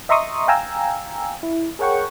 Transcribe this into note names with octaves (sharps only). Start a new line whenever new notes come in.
D#5 E5 A#5 C6 C#6 D#6
F5 G5 G#5 A#5 E6
E4
G#4 A#4 C#5 F#5 G5 C#6